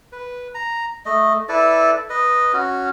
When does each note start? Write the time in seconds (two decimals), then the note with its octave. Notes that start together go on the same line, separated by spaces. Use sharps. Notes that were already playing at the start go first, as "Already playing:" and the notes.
0.12 B4
0.55 A#5
1.06 A3 D#5
1.49 E4 A4 B4 D5
2.10 B4 D#5
2.53 C#4 F#4